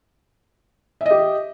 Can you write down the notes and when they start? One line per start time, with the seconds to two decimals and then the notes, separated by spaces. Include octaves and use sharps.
1.01 E5
1.06 D#5
1.11 G4